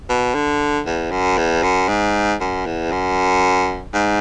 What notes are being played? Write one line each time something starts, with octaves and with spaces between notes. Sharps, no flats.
B2
D3
E2
F#2
E2
F#2
G#2
F#2
E2
F#2
G#2